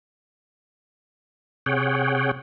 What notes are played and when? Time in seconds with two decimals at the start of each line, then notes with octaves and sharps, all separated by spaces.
1.66 C3 G#4 C#5 F#5 G5